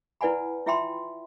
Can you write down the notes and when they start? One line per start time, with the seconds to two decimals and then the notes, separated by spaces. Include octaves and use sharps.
0.21 E4 B4 D5 F#5 G#5 B5
0.66 E4 F4 E5 G5 B5 C6